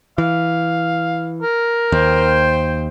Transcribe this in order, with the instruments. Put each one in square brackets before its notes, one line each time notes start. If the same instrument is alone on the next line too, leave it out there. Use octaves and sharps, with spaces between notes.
[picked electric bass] E3 [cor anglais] F5
[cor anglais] A#4
[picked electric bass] D#2 [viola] C5 G5